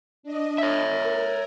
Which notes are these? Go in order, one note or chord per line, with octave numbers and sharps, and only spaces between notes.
D4 D#5
C#5 E5
A#4